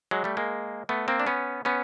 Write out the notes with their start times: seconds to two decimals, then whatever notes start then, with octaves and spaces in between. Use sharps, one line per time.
0.11 F#3 G#3
0.24 G3 A3
0.37 G#3 A#3
0.89 A3 B3
1.08 A#3 C4
1.20 D4
1.27 B3 C#4
1.65 B3 C#4